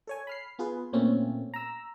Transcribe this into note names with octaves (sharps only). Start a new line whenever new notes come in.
A4 C#5 G#5
B5 F6 C7
B3 F4 G#4 B4
A#2 A3 A#3 C4 C#4
A#5 E6